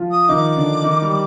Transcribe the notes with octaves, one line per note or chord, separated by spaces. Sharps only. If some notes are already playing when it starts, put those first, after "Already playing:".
Already playing: F3 F4
D#6
D#3 D#4 D6
D3 D4
D#3 D#4
G3